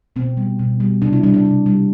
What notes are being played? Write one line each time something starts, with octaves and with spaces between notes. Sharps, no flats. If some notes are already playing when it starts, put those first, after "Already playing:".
B2 C4
G3
B2
G3
C3 D4
E4
G3 D4
D4
C3
G3